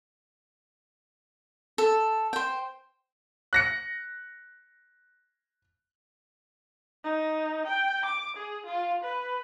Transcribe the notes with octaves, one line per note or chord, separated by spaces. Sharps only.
A4
C5 G5
F#6 A#6 C#7
D#4
G5
D6
G#4
F4
B4